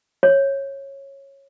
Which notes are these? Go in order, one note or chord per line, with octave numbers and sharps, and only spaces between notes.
C#5